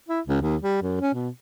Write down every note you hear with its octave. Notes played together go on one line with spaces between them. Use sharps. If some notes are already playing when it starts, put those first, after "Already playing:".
E4
C#2
D#2
G3
F#2
C#4
B2